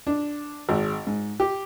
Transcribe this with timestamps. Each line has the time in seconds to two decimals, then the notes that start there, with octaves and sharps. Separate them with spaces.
0.07 D4
0.69 G#1
1.07 G#2
1.40 G4